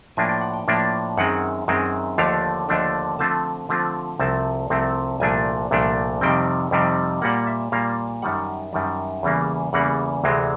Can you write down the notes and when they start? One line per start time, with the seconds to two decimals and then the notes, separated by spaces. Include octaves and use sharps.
0.17 A2 F3 A#3 D4 G#5
0.29 G5
0.41 F#5
0.54 G5
0.68 A2 F3 A#3 D4
1.17 F#2 D#3 G#3 C4 F#5
1.68 F#2 D#3 G#3 C4
2.18 D#2 D3 F3 A3 D4 F5
2.69 D#2 D3 F3 A3 D4
3.19 D3 F3 A3 C4 F4 A5
3.69 D3 F3 A3 C4 F4
4.19 C2 C3 F3 A3 C4 A5
4.70 C2 C3 F3 A3 C4
5.20 C2 A#2 F3 A3 D4 G#5
5.71 C2 A#2 F3 A3 D4
6.21 F2 C3 D#3 G3 C4 G5
6.71 F2 C3 D#3 G3 C4
7.22 A#2 G3 A#3 F#5
7.47 E5
7.72 A#2 G3 A#3 F5
8.22 F#2 D#3 G3 F#5
8.73 F#2 D#3 G3
9.23 E2 C#3 E3 G3 A#3
9.73 E2 C#3 E3 G3 A#3 F#5
10.24 D2 C3 E3 G#3 C4